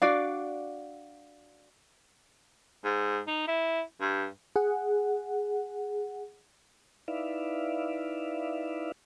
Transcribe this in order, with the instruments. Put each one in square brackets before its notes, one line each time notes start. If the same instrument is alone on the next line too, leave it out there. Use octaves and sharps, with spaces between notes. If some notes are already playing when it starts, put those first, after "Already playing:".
[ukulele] D4 F#4 D5 F5
[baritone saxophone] G#2
D#4
E4
G2
[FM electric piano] G#4 F#5
[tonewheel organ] D#4 E4 B4 D5 E5 F5